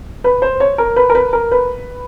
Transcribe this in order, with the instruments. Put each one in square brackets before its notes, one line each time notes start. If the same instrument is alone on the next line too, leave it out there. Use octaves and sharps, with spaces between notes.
[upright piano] B4
C5
C#5
A#4
B4
A#4
B4
A#4
B4